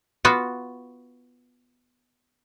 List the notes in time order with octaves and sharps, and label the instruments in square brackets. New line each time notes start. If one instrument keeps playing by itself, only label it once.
[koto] B3 F4 F#4